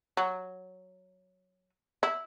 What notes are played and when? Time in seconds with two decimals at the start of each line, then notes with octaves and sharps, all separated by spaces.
0.17 F#3
2.03 E4